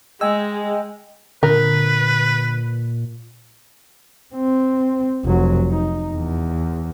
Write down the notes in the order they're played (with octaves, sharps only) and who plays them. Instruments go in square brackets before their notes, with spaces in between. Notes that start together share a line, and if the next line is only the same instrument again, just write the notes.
[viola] G#3 [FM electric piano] D#5 G5 G#5 [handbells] E6
[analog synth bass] A#2 [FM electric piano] D3 [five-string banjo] A#4 [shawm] B4
[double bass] C4
F1 F#3
D#4
E2